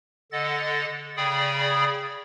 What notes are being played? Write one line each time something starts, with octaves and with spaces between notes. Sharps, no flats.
D3 A4 D#5 F#5 A6
C#3 G#4 D5 G5 B5 D#6